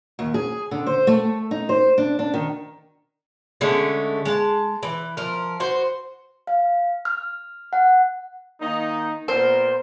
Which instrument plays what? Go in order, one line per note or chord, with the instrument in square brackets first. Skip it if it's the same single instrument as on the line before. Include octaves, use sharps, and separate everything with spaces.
[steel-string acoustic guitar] D#2
G#4
D3
C5
A3
D#4
C5
D4
D4
D#3
[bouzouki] D3 G#3 A3 C#4
G#3 A5
E3
F3 A#4
F#4 C5
[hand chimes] F5
F6
F#5
[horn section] D#3 A#3 D#4
[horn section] A#2 B3 A#4 [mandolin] C5